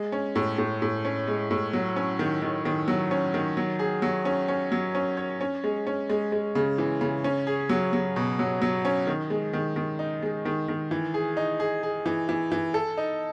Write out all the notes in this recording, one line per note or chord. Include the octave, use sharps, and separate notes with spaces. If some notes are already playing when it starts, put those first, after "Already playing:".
Already playing: G#3
C#4
A2
A2
A2
C#4
G#3
A2
F#3
C#4
D#3
D#3
D#3
F#3
C#4
D#3
F#3
G#4
F#3
C#4
C#4
F#3
C#4
C#5
C#4
G#3
C#4
G#3
G#3
C#3
E3
C#3
C#4
G#4
F#3
F#3
B2
F#3
F#3
C#4
D#3
G#3
D#3
D#3
D#4
G#3
D#3
D#3
E3
G#4
D#4
G#4
G#4
E3
E3
E3
A4
D#4